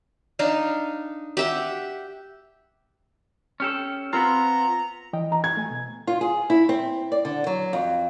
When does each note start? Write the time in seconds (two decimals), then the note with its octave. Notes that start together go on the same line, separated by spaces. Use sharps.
0.39 D4 D#4 F5
1.37 G4 E5 F#5
3.60 C#4 G4 A4
4.13 B3 C4 F4 A#5
5.13 E3 D#5 G5
5.32 A#5
5.44 G#6
5.57 A3 G#5
5.70 B2
6.07 F4
6.21 G#4
6.50 E4
6.69 C4
7.12 D5
7.25 D3
7.47 F#3
7.73 F2